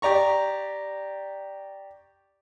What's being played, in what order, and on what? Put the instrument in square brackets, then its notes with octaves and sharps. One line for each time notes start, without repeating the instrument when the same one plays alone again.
[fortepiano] G4 D5 A#5 C#6